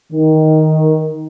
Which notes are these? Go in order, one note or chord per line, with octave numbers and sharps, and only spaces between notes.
D#3